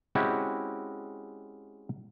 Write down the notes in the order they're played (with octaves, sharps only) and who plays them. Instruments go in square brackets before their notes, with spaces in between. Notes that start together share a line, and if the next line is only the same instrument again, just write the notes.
[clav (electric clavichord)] G#3 C4 C#4 E4 F#4 G4